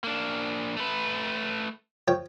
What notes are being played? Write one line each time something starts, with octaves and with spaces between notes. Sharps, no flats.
A#3 D4
A3 B4
F3 C#5 G5